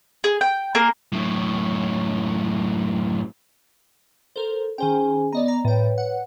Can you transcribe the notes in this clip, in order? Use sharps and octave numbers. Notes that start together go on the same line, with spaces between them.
G#4
G5
A#3 G#4 A#4
F#2 A2
A4 A#4 C5
D#3 C#4 G#4 C5 G5 G#5
B3 D5 D#5 A#5
D5 A#5
A2 B4 C#5 G5
F#5